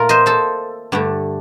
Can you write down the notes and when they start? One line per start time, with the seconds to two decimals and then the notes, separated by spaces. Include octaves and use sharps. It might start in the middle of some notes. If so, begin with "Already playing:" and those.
Already playing: A#2 A3 F4 A#4
0.09 C5 D#5
0.26 A4 C5
0.92 G2 D3 A3